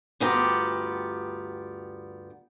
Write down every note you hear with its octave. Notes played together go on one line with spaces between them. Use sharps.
D2 G2 B3 F4 G4 A#5